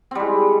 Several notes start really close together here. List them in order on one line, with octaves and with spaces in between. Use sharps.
C4 G3 G#3